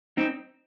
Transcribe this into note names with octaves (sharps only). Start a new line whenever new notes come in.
C4 D#4